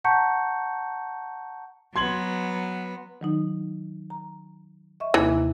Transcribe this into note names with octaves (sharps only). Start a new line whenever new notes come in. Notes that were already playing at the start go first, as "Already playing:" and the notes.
F#5 A5 A#5 C#6 G6 C#7
F#3 B3 C6 G#6 F#7
D#3 F#3 D#4
A#5
D#5 E5 C#6
D#2 C3 E3 A#3